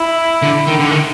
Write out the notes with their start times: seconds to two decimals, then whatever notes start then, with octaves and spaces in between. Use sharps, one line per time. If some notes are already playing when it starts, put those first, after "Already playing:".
Already playing: E4
0.42 D3
0.67 D#3
0.79 D3
0.91 D#3